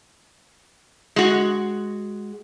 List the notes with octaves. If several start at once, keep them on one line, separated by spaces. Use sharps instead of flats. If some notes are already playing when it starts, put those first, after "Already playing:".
G#3 F#4